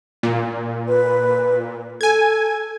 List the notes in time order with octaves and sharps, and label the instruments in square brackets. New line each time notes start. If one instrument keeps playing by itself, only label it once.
[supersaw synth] A#2
[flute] B4
[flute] A4 [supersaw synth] G#5 G#6